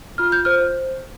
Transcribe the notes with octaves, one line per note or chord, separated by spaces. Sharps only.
F4 F6
G6
C5 F6